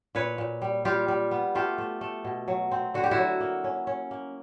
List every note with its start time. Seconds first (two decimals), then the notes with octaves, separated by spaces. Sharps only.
0.15 A#2 B4 C#5
0.38 A#2
0.62 G3
0.85 G3 F4 G4
1.08 G3
1.31 B3
1.55 A3 F4 G4
1.78 A3
2.01 A3
2.25 B2
2.48 F#3
2.71 C4
2.94 D3 F#4
3.04 G4
3.11 E4 F#4
3.18 F#3
3.40 A#3
3.64 C#4
3.87 C#4
4.11 A#3